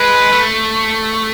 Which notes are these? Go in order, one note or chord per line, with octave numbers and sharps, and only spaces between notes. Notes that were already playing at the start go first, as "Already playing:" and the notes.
Already playing: G#3 B4
A3